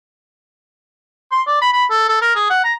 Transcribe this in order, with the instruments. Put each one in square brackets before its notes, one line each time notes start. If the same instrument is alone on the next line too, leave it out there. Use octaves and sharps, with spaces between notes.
[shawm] C6
D5
B5
B5
A4
A4
A#4
G#4
F#5
A#5